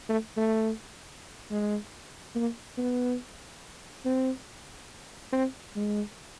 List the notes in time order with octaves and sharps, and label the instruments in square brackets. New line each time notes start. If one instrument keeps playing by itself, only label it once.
[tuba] A3
A3
G#3
A#3
B3
C4
C4
G#3